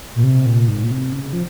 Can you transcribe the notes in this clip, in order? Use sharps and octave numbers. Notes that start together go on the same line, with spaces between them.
A#2
C3
A#2
G#2
A#2
C3
C#3
F3